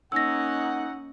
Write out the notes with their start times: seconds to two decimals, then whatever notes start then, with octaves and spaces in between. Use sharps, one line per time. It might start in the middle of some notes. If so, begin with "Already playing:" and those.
0.12 A#3 C#4 D#4 F#5 E6 A#6